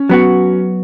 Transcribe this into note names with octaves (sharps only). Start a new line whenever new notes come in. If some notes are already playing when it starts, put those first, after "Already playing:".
Already playing: C#4
F#3 B3 F#4